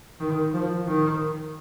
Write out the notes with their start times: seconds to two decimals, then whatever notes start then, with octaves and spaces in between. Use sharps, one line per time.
0.20 D#3
0.53 F3
0.87 D#3